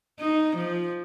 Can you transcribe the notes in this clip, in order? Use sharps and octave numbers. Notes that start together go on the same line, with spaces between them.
D#4
F3